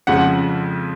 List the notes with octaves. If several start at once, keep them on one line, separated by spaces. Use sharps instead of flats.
F2 C#3 F3 G#3 F#5